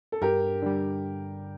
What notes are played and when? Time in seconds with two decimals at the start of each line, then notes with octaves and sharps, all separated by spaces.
0.12 A4
0.22 G2 G4 A#4
0.62 D3 G3